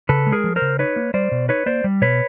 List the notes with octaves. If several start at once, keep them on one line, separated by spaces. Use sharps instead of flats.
C#3 A4 B4
G#3
G#4 A#4
F3
A#4 C5
C#3
D#4 B4 C#5
A#3
G3 C5 D5
B2
D#4 B4 C#5
A#3 C5 D5
G3
B2 B4 C#5